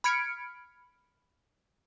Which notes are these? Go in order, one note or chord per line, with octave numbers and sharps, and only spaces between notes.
B5 F6 G#6 C#7 D7